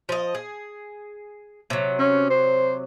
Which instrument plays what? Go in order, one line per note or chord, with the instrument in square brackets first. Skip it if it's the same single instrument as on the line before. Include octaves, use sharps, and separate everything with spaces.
[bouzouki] F3 D#5
G#4
C3 F#3
[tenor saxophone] C#4
C5